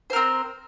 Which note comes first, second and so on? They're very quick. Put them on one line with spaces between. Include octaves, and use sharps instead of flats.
C5 A#4 C4